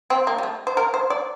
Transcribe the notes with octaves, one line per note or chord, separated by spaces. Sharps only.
C4
A#3
G3
A3
C5
A#4
C5
D5